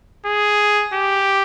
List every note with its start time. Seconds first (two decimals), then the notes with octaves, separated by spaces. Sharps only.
0.26 G#4
0.93 G4